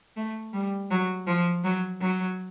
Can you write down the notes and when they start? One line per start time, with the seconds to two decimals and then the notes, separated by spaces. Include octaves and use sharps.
0.16 A3
0.53 G3
0.90 F#3
1.27 F3
1.64 F#3
2.01 F#3